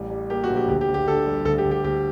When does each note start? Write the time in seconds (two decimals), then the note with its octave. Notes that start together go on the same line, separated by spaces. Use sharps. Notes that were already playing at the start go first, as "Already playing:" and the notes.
Already playing: A1 G3
0.10 G3
0.30 A#3 G4
0.44 F#4
0.50 A#1
0.56 G4
0.68 D2 G4
0.81 G4
0.88 D2
0.94 G4
1.07 D3 A4
1.26 G3
1.45 D2 A4
1.58 G4
1.65 D2
1.71 G4
1.84 D2 G4